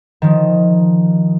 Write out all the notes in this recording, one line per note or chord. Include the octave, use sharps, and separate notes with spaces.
D#3 F3